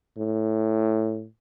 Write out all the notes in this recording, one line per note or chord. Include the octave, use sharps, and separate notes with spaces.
A2